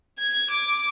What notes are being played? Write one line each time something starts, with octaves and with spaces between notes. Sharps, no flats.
G#6
D6